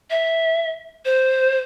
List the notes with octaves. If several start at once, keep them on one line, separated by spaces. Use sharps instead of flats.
E5
C5